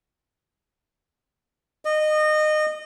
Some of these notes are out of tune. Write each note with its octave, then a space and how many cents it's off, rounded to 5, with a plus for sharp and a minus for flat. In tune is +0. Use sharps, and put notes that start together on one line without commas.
D#5 -25